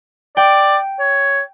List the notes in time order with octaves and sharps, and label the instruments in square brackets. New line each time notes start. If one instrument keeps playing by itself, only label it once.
[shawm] D5 [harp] G5
[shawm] C#5